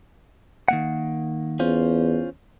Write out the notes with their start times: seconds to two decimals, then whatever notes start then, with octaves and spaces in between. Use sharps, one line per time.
0.68 D#3 A#3 F#5
1.59 E2 C#4 F4 C5